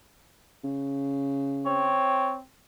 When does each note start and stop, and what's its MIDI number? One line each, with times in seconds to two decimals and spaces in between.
0.64 1.98 49
1.66 2.42 60
1.66 2.35 73